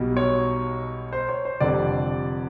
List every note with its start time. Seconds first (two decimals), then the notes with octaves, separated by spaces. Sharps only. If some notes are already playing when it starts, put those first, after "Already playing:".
Already playing: B1 B2 G3
0.17 C#5
1.13 C5
1.29 C#5
1.45 C5
1.60 F1 F2 D3 G3 D5